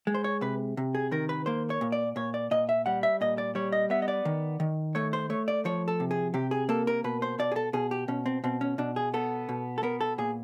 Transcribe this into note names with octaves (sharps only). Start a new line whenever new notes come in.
G#3
C5
C#5
C3 B4
C3
G#4
D#3 A#4
B4
A#3 C5
C#5
A#2
D5
A#2 C#5
D5
A#2 D#5
E5
G3 F#5
E5
A#2 D#5
D5
G3 C#5
D#5
B3 E5
D#5
D5
D#3
D#3
A3 C#5
C5
A3 C#5
D5
F3 C#5
A4
C3
G#4
C3 G4
G#4
A#3 A4
A#4
B2 B4
C5
B2 D5
G#4
A4
B2 G#4
G4
B2 C#4
C4
B2 C4
C#4
B2 D4
G#4
B3 A4
B2
A4
B3 A#4
A4
A#2 G#4